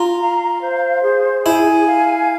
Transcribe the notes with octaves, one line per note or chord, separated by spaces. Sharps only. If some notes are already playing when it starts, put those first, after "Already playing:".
Already playing: F4 A#5
F5
C5
G#4
E4 G#5
F5